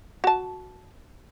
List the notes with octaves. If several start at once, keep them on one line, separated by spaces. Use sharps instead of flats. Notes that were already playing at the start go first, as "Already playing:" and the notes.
F#4 A5